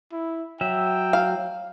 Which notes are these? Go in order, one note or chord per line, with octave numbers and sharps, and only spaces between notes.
E4
F#3 E5 G5
F5